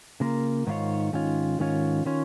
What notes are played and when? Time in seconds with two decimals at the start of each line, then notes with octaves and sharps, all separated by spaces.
0.20 C#3 A#3 F4 A#4
0.67 G#2 D#3 C#4 F4 C#5
1.13 G#2 D#3 C#4 F4 C#5
1.59 G#2 D#3 C#4 F4 C#5
2.05 D#3 C#4 F4 C#5